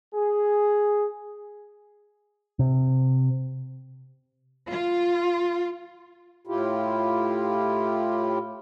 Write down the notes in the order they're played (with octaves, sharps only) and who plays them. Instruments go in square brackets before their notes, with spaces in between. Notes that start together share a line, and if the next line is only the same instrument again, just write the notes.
[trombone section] G#4
[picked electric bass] C3
[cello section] F4
[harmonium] A2 E4 F4 G4